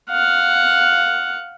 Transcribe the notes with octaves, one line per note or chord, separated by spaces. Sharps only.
F5 F#5